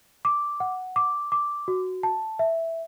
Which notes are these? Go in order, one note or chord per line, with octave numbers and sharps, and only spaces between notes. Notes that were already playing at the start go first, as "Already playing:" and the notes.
D6
F#5
D6
D6
F#4
A5
E5